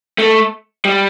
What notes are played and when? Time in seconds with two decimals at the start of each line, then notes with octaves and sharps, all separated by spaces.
0.18 A3
0.85 G3